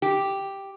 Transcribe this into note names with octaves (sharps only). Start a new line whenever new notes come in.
G4